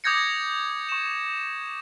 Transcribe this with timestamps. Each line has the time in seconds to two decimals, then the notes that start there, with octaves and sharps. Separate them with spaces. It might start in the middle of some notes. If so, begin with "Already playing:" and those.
0.04 D6 D#6 G6 G#6 A#6 C#7
0.89 C#6 E7